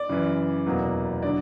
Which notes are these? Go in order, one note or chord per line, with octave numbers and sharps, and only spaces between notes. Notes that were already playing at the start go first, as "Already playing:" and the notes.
Already playing: D5
F#2 C#3 E3
F1 E2 B2 F#3 A#3
D3 F#3 D5